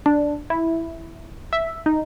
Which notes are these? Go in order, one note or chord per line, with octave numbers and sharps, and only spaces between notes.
D4
E4
E5
D#4